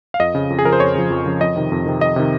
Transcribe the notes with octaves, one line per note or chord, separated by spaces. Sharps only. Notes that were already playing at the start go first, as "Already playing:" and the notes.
F5
F2 D#5
C#3 F3
F2
G#4
C#3 F3 A#4
C5
F2 C#5
C#3 F3
F2
C#3 F3
F2 D#5
C3 D#3
F2
C3 D#3
F2 D#5
C3 D#3